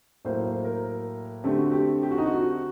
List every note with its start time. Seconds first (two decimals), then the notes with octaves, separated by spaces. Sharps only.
0.25 A2 F#3 A#3 C5
0.46 C5
0.64 A#4
1.44 D3 A3 C4 G4
1.57 F#4
1.71 G4
2.03 G4
2.11 F#4
2.18 D#4
2.26 F#4